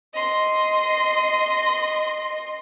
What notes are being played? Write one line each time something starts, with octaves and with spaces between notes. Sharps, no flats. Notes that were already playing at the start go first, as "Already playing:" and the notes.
D#5 C6